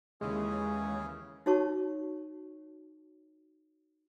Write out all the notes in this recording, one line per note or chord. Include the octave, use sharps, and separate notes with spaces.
D#2 C#3 E3 G#3 C#4 G#4
D#4 F#4 C#5 A5 C#6